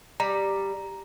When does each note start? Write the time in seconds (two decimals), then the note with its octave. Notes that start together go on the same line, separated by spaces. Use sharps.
0.20 G3 A#5